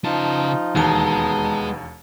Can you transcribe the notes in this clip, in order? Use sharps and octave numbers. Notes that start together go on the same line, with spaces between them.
C#3 F3 D#4 F4 A5
E1 D#2 G#3 B3 A5 A#5